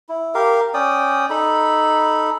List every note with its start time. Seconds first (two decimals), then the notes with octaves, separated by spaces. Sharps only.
0.09 E4
0.34 G4 A#4 F5
0.74 C#4 D5 G5 D#6
1.30 D#4 A4 B5